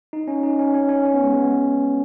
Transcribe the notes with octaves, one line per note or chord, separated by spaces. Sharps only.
D#4
C#4
D#4
C#4
C#4
C#4
C#4
B3
G#3
B3